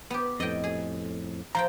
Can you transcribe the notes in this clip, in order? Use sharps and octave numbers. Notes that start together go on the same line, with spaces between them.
B3 G4
F2 A2 D#5 G5
G#4
F3 C5 G5 A#5